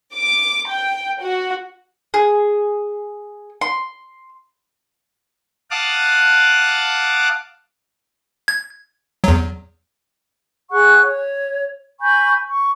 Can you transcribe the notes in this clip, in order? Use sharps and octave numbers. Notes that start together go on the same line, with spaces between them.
D6
G5
F#4
G#4
C6
F5 F#5 A5 D6 D#6 F#6
G#6
E2 F#3
G#4 F#5 C#6 F#6
C#5
G#5 B5 C#6 G6
C#6